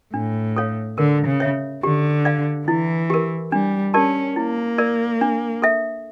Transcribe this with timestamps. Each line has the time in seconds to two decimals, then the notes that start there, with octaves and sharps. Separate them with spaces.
0.14 A2 D4
0.56 A4 C#5 F5
0.98 D3 A#4
1.26 C#3
1.40 C#5 E5
1.83 D3 G4
2.25 D5 F5
2.67 E3 E4
3.10 G4 A#4
3.52 G3 D4
3.94 C#4 G4 A#4 D5 A5
4.36 A#3 E4
4.78 A#4 D5
5.21 D4
5.62 A4 E5